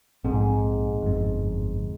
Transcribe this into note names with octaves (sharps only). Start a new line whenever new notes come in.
A#1 G#2 C4
G1 F2